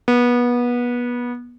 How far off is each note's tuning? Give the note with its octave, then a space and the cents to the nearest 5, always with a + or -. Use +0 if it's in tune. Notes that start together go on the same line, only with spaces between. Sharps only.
B3 -25